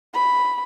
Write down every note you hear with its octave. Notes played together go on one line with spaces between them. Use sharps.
B5